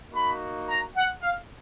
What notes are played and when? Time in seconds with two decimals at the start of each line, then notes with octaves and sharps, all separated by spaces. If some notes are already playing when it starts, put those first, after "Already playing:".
0.11 A#3 D#4 F#4 B5
0.67 A#5
0.96 F#5
1.23 F5